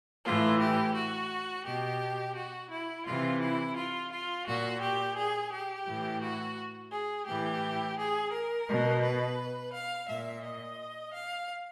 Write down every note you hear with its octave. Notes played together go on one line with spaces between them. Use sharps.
A2 E3 F4
G4
F#4
B2 G4
F#4
E4
C3 E3 F4
E4
F4
F4
A#2 F#4
G4
G#4
G4
A2 E3
F#4
G#4
A2 E3 G4
G#4
A#4
B2
B4
F5
A#2 E5
D#5
F5